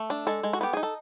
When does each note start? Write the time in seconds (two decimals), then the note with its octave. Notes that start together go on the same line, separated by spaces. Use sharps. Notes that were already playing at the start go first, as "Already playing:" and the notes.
Already playing: A3
0.10 D4
0.27 G#3 A4
0.43 G#3
0.53 F#4
0.61 B3 G4
0.73 D#4 G#4
0.83 A4